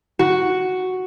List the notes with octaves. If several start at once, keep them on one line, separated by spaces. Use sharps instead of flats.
F#4